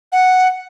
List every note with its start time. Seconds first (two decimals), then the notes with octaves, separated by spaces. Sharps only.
0.12 F#5